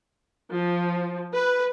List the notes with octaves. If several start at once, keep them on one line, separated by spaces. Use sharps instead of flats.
F3
B4